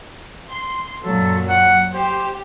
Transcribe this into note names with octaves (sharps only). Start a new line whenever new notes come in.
C6
F#2 A#2 F#3 A4
F#5
G4 C5